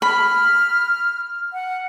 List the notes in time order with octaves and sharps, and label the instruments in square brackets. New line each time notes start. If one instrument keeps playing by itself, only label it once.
[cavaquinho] B5 [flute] F6
[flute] F#5